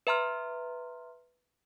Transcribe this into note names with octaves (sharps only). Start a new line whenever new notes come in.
B4 E5 A#5 C6 F6